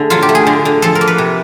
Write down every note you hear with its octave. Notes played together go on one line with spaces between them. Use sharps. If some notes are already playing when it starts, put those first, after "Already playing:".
Already playing: D3 A3 G#4
F#3 F4
G4
A3
G#4
D3
D3
F3 A4
A#4
A#3
B4
C3